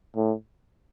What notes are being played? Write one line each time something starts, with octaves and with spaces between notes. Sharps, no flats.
A2